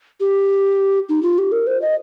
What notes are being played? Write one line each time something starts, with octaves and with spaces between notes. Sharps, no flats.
G4
D#4
F4
G4
A#4
C5
D#5